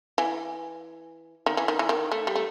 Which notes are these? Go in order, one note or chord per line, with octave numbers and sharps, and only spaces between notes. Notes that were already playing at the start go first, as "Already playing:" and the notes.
E3
D#3
E3
D#3
E3
D#3
A3
G3
A3